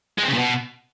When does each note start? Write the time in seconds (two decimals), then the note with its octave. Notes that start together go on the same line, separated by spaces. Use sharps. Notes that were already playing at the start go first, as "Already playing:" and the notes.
0.18 G#3
0.23 C4
0.28 C#3
0.33 A#2
0.38 B2